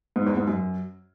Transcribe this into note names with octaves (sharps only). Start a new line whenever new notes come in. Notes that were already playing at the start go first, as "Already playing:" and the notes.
G#2
E2
G#2
F#2